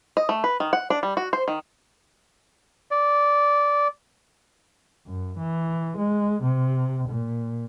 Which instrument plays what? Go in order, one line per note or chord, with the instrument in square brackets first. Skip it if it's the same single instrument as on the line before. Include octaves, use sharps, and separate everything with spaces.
[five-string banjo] D#5
A3
B4
D#3
F#5
D4
G3
F#4
C5
D#3
[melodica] D5
[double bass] F#2
E3
G#3
C3
A#2